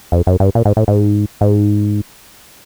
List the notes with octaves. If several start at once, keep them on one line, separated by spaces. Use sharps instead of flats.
F2
F#2
G2
A#2
G#2
A2
G#2
G#2